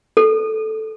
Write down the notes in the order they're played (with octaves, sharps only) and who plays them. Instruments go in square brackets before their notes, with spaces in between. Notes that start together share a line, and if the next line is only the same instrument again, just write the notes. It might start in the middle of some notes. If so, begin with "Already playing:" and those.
[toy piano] A4